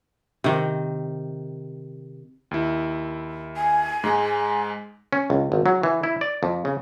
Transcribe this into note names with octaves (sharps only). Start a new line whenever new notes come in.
C3 D#3
D#2 E4
G#5
G#2 G#3
C#4
C#2
G#1
F#3
E3
E4
D5
F2
C#3